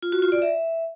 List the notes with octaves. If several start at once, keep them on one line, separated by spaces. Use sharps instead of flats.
F4
F#4
F4
D5
E5